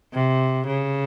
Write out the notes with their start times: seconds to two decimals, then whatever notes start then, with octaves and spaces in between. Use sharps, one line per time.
0.14 C3
0.66 C#3